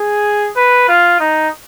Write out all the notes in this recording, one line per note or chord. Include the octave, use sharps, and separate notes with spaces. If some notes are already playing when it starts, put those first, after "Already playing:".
Already playing: G#4
B4
F4
D#4